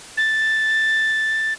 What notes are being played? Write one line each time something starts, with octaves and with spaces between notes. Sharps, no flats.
A6